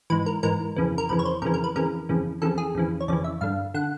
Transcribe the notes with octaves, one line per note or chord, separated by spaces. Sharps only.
G#2 E3 B4
A#4
G#2 E3 A#4
F2 C#3 E3
A#4
F2 C#3 E3 B4
C#5
C5
F2 C#3 E3 A#4
A#4
B4
F2 C#3 E3 A#4
F2 C#3 E3
F2 C#3 E3 A4
G#4
F2 C#3 E3
C#5
F2 C#3 E3 D5
E5
G2 D3 F5
D3 F#5